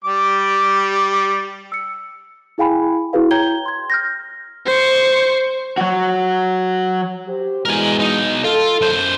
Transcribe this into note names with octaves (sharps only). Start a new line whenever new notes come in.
G3 D6
E6 C#7
E4 G#4 F5 G5 G#5 B5
E4 F#4 G#4 B4 F5
C#5 G5 A#5 G6 G#6 G7
C6 G#6
F6 G6 A#6
C5 C#6
F#3 F#4
G4 C5
B2 E3 G#3 A#4 G#5
B1 D#4
F4 A4
F#2 C5